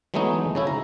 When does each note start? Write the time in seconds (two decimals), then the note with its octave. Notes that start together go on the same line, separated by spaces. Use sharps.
0.14 E3 F#3 G#3 A3 B3 D#4
0.55 C#3 C#4 E4
0.67 A#5